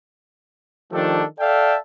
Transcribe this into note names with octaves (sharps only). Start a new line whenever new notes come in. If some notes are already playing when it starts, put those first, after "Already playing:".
D#3 F3 A3 D4 G4 A4
A4 D5 E5 F5 G5 A5